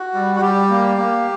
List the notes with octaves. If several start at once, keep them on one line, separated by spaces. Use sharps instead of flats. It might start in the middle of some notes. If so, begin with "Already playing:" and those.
Already playing: F#4
G3
F#4
G3 G4
A#3
A#3